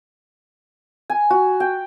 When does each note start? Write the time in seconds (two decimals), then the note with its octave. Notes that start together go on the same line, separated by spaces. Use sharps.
1.10 G#5
1.30 F#4
1.60 G5